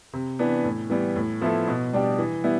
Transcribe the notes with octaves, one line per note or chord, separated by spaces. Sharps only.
C3
E3 B3 D4
A2
E3 G3 B3
A2
F3 B3 E4 A4
B2
G3 D4 G4
E3
G3 B3 E4